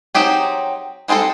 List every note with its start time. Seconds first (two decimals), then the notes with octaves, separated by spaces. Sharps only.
0.15 F#3 C4 D#4 G4 G#4
1.08 G3 G#3 C4 F4 A4